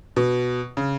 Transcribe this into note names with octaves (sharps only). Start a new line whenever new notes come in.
B2
C#3